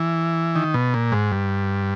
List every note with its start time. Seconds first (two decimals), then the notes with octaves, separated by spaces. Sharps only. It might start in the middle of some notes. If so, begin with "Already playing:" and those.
Already playing: E3
0.55 D#3
0.74 B2
0.94 A#2
1.12 G#2
1.32 G2